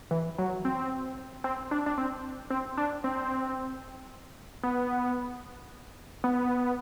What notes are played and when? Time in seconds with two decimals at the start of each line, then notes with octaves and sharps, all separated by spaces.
0.11 E3
0.38 F#3
0.65 C4
1.44 C4
1.71 D4
1.86 D4
1.98 C4
2.50 C4
2.77 D4
3.04 C4
4.63 B3
6.24 B3